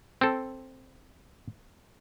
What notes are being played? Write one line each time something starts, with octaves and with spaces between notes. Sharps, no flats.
C4 A4